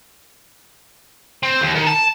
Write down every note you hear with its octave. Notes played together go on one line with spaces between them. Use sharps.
C4
D#2
D#3
A5